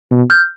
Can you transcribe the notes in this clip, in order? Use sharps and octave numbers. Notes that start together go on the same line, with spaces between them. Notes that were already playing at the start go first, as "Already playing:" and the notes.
B2
F6 G6